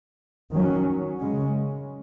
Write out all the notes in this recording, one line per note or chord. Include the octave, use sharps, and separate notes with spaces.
D#3 F#3 C#4
C#3 G#3 C#4